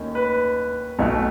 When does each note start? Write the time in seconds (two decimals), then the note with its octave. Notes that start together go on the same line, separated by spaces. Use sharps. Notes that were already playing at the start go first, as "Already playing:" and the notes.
Already playing: D#2 D#3 A3 C#4
0.15 B4
0.99 B1 B2 A3